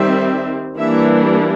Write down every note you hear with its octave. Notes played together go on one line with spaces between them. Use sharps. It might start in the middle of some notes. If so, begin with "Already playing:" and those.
Already playing: D#3 G3 C4 E5
E3 G3 A#3 D4 E5